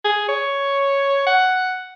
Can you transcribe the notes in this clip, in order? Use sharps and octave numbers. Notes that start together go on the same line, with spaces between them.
G#4
C#5
F#5